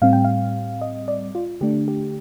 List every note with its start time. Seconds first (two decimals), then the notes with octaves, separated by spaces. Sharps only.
0.02 A2 G3 C4 F5
0.13 G5
0.24 F5
0.81 D#5
1.08 D5
1.35 F4
1.61 D3 A3 D4 G4
1.88 G4